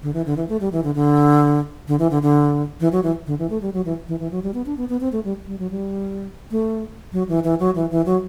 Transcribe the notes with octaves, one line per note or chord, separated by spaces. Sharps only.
D3
E3
D3
E3
A3
G3
E3
D3
D3
D3
E3
D3
D3
E3
F#3
E3
D3
E3
A3
G3
F#3
E3
E3
E3
F#3
G3
B3
D4
B3
B3
C4
A3
G3
G3
F#3
G3
A3
F#3
E3
E3
F#3
E3
E3
F#3